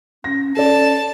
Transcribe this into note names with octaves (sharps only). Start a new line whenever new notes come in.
C#4 A#6
C#4 A4 D5 A5